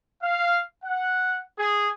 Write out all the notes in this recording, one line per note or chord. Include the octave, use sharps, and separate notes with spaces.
F5
F#5
G#4